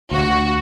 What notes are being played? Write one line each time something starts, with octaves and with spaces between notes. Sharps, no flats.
D2 F#4